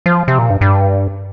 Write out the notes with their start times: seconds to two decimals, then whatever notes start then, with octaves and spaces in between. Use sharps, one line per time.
0.06 F3
0.28 C3
0.38 A#2
0.50 G2
0.61 G2